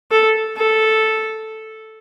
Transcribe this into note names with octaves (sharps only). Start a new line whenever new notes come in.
A4
A4